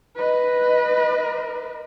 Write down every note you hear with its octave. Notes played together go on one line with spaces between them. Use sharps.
B4 D#5